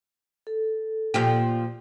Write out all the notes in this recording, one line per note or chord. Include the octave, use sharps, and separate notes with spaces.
A4
A#2 F3 G4